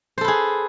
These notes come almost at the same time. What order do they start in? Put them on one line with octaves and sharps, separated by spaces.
C5 A4 B4 G#4